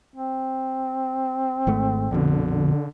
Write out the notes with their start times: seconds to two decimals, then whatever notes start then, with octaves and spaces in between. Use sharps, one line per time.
0.16 C4
1.67 G#1 G#2 A3
2.11 A#1 F2 B2 D3